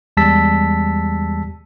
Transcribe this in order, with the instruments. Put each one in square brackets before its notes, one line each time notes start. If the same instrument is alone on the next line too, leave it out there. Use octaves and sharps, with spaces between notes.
[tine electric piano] E2 G3 G#3 A5 E6 B6